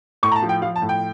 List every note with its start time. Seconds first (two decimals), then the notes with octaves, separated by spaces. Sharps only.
0.23 A2 C#6
0.32 A#5
0.36 A5
0.42 F3
0.49 G5
0.62 F3 F5
0.76 A5
0.82 A2
0.89 G5